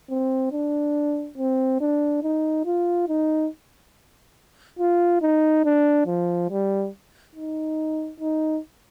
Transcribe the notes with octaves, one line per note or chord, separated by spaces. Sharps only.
C4
D4
C4
D4
D#4
F4
D#4
F4
D#4
D4
F3
G3
D#4
D#4